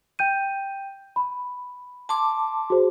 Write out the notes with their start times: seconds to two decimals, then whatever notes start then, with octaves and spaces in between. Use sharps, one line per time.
0.19 G5 G6 D#7
1.16 B5
2.09 A5 C6 D6
2.70 F#4 G#4 C5